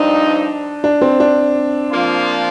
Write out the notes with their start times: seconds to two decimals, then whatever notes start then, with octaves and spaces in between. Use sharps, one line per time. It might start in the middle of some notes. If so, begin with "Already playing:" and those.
Already playing: G2 F3 C4 D4 D#4
0.84 D4
1.01 C4
1.20 D4
1.91 F3 A#3 F4